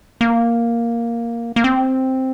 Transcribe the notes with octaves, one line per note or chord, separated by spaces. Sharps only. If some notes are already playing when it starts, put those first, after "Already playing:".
A#3
A#3
C4